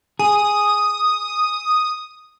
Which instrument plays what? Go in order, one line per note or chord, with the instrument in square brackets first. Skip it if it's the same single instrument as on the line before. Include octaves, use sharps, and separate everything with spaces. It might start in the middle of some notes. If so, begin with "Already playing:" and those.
[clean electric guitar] G#4 [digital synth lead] D#6